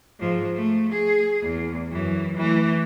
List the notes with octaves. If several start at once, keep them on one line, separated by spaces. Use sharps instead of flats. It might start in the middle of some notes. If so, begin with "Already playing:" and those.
G#2 F3
A3
G#4
E2
F#2 E3
E3 A3